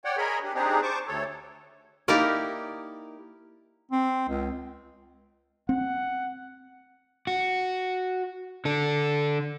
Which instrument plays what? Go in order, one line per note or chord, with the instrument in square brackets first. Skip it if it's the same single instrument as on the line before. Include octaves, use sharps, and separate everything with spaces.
[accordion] C#5 D5 F#5 G5
G#4 A#4 C#5 D#5 B5
D4 G4
C4 D4 D#4 G4 G#4
C5 A5 C#6 D6
D2 A4 C#5
[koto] A#3 D#4 E4 G4 A#4 D5
[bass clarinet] C4
C#2
[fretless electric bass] C4 [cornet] F#5
[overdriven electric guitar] F#4
D3 A4